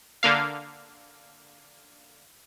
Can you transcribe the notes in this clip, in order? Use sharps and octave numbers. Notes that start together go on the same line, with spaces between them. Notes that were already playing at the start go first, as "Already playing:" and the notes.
D3 A#3 F5